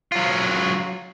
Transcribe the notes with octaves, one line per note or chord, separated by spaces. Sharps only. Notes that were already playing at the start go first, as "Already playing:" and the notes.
F#3 F4